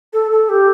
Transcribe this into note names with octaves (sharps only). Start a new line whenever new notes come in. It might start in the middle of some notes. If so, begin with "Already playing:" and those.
A4
A4
G4